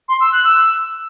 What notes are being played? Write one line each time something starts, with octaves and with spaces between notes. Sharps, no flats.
C6
E6
F#6
E6